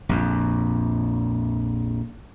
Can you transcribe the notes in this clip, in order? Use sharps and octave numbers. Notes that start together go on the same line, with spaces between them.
A#1 F2